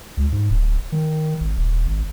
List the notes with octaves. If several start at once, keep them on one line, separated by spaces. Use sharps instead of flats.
C#2
G#2
D1
D#3
G#1
D#1
G#1